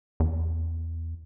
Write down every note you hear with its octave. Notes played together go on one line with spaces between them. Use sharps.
E2